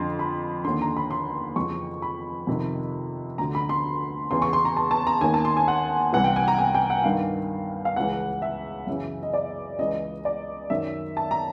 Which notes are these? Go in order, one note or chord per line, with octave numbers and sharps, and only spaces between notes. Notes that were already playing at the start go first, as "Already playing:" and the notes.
Already playing: F2 D3 C6
B5
D#2 D3 C6
A#5
B5
C6
F2 C#3 E3 C#6
B5
F2 C3 D#3
D2 D3 A#5
B5
C6
E2 C#3 E3 C6
C#6
C6
A#5
A5
A5
A#5
D#2 D#3 G#5
A5
C6
G#5
F#5
C2 C3 E3 F#5
G5
G#5
A#5
G#5
G5
F#5
G2 D#3 F5
F5
C#2 C#3 E3 F#5
E5
F#2 C#3 E3 E5
D#5
D5
C#2 C#3 E3 D#5
D5
F#2 D#3 E5
A5
A#5